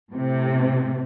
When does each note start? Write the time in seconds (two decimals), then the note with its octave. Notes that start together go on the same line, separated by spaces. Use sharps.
0.11 A2 C3